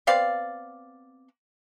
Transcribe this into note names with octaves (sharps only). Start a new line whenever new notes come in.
B3 C4 D5 F5